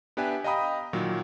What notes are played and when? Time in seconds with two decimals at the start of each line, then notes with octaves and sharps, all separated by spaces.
0.17 B3 D4 G4 B4 E5 G#5
0.44 D#5 F5 G5 A#5 B5 D#6
0.93 A#2 D#3 F#3